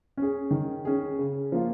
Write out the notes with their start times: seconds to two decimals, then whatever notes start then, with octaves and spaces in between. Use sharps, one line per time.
0.17 C#4 G#4
0.51 D#3
0.85 C#4 G#4
1.19 C#3
1.52 F3 A#3 F4